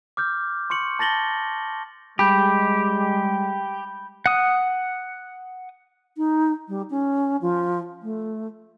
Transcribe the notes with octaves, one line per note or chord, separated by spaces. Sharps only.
D6 F6 G6
C6 C#6 C#7 F#7
A5 A6 A#6 F#7 G7
G3 G#3 G4 B5 G6
F#5 D#6
D#4
G3
C#4
F3
A3